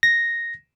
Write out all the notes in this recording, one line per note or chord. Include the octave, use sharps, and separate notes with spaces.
A#6